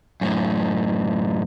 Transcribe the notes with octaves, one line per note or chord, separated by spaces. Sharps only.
F#2 A2